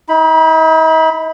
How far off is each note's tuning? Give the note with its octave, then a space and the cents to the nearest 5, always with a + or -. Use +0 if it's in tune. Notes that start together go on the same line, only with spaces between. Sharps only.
D#4 +45 B5 +0